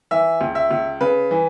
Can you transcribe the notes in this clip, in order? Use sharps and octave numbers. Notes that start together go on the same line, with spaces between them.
E3 E5
C#2
E5
C#2
C#3 B4
E3